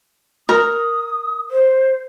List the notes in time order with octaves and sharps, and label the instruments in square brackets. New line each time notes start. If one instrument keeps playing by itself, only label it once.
[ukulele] A#4 [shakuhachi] D#6
[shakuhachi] C5